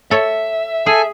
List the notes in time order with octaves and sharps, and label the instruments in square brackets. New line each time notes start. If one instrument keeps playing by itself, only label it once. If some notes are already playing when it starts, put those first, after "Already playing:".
[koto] A4 C#5 [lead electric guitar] E5
[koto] G#4 [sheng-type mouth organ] A4 G#5